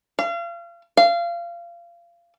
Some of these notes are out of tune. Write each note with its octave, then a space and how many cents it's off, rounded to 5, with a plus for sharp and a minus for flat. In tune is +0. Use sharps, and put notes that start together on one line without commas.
F5 -35
F5 -25